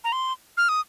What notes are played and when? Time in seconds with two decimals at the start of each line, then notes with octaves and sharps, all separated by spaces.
0.04 A#5
0.12 C6
0.57 F6
0.69 D#6